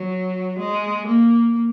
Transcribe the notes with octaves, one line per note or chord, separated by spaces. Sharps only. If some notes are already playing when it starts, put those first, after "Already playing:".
Already playing: F#3
G#3
A#3